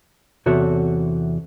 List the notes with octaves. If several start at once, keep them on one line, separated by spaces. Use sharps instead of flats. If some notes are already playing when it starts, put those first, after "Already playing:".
E2 C3 F#4 A4 C#5 E5